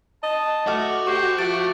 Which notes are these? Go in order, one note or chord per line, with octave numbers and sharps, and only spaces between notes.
D#5 A5
A3 F#4 D6 F6
G4 C5 C#6
F3 A3 D6 A6 D7